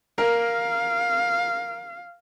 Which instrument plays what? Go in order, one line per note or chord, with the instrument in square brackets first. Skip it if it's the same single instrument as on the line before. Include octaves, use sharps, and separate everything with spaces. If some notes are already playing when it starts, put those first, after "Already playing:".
[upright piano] A#4 [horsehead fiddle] F5